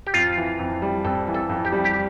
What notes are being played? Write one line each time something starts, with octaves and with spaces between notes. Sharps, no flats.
G4
F2 F4
E3
F2
G3
F2 A4
E3
A4
F2
G4
G3
G4